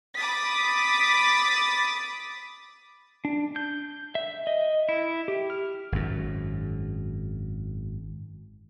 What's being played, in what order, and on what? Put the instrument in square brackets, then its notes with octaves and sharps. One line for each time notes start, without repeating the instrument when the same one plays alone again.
[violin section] B5 D6 D#6 A6 B6
[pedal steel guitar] D4
G6
E5
D#5
E4
G4
F6
[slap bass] G#1 F#2